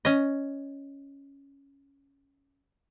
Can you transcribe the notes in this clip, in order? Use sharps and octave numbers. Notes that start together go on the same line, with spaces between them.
C#4 D#5